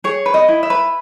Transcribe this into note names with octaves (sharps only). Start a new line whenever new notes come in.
G#4 C#5
B4
D#5
E4
E5
B4